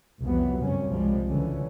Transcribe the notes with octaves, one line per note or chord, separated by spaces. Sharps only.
C2 F2 E3 F#3 G3 B3
C#2 F#2 C3 G3 C#4
C2 F3 G3 G#3
C#2 D3 E3 C#4